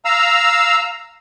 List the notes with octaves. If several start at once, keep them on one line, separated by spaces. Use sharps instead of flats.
F5 A#5 E6